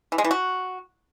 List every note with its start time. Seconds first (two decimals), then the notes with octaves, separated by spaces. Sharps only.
0.12 E3
0.18 G#3
0.24 E3
0.31 F#4